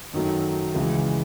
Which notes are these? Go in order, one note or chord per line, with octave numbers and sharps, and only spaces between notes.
F#2 D#3 F#3 A3
C#2 C#3 E3 G#3